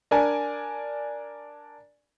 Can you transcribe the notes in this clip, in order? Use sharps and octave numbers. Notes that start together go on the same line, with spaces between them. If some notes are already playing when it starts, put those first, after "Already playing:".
D4 A#4 D5 G#5